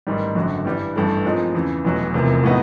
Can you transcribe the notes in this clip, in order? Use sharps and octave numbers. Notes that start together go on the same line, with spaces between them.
A1 G#2 D#3 G3
G#1 F#2 D3 F#3
G2 E3 G3
A1 G2 E3 A3
A#2 F3 G#3 C4 D#4
E2 C#3 E3
F1 E2 B2 F#3
F1 E2 C3 F3 A#3
A2 F#3 B3 D#4